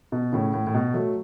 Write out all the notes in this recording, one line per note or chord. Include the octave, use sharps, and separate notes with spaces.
B2
A2 C#3
A2
A2
B2
F#3 A3